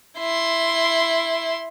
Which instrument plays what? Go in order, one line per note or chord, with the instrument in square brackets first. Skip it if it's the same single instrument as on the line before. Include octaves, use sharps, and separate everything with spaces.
[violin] E4 C6